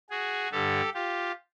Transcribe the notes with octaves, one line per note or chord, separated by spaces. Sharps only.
F#4 G#4
G2 D3 G3 G4 A4
F4 G4